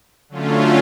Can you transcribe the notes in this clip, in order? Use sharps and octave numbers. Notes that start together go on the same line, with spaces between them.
D3 F#3 A3 C#4 F4